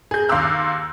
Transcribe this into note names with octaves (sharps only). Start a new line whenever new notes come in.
G#4 G6
D#2 F5 C6 D6 E6 F#6